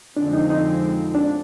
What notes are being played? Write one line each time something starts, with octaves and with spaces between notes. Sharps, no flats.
F2 D3 F3 G#3 C4 D4
D#4
D#4
D4